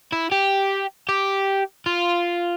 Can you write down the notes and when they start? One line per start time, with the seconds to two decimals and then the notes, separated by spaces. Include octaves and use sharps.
0.12 E4
0.32 G4
1.09 G4
1.86 F4